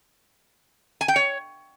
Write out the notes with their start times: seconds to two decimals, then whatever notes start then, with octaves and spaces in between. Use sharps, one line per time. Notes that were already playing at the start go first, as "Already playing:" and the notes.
1.01 G#5
1.08 G5
1.16 C#5